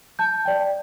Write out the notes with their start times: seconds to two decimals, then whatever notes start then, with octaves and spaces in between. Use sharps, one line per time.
0.19 A5 G6
0.45 D5 G5